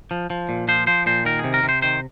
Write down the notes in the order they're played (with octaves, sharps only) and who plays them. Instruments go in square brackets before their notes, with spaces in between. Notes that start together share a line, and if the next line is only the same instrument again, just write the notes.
[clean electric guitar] F3
F3
A#2
F3 C5
F3 C5
A#2 C5
D#3 A#4
G#4
C3
A#4
C3
C5
D#3 C5